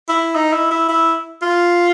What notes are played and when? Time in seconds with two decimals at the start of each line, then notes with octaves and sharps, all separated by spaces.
0.09 E4
0.36 D#4
0.53 E4
0.71 E4
0.89 E4
1.42 F4